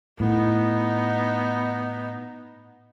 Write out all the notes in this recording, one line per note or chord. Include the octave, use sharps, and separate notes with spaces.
A2 B3 D#4